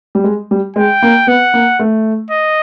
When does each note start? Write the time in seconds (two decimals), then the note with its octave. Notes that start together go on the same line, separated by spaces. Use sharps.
0.15 G3
0.24 G#3
0.51 G3
0.76 G#3 G5
1.02 A#3
1.27 B3 F#5
1.54 A#3
1.79 A3
2.31 D#5